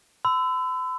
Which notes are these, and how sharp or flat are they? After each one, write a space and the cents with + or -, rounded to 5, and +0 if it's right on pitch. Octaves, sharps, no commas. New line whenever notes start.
B5 +45 E6 +0